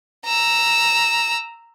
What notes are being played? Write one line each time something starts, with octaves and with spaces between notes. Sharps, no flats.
A#5 E6